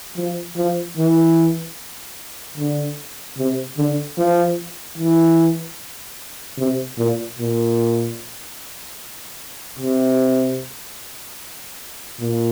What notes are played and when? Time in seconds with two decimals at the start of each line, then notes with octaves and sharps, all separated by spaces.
0.17 F3
0.57 F3
0.97 E3
2.57 D3
3.38 C3
3.77 D3
4.18 F3
4.98 E3
6.58 C3
6.98 A#2
7.39 A#2
9.79 C3
12.20 A#2